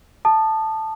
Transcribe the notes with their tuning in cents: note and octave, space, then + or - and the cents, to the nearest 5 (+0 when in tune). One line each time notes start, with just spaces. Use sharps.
A5 +0 D#6 -30